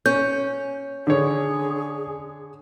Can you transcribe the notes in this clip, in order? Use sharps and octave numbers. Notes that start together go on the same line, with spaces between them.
C#4 G6
D3 G#4 C#5